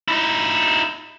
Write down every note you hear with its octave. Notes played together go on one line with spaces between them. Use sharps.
D#4 E4